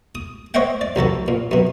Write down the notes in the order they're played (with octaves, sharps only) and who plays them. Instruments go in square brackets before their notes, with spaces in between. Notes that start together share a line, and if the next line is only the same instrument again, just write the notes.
[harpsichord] D#6
C5 C#5 D#5 E5 F#5 G5
D5
C2 F#2 F#3 A4
A#2
F#2 B2